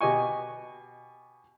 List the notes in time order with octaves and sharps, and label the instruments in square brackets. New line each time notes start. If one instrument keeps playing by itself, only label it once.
[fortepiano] B2 G4 D#5 G#5 C#6